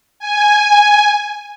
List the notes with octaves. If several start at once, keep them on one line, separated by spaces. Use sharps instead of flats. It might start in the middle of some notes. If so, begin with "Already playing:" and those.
G#5